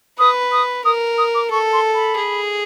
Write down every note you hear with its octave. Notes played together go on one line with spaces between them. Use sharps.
B4 D#6
D#6
A#4 D#6
D#6
D6
A4 C#6
C6
B5
G#4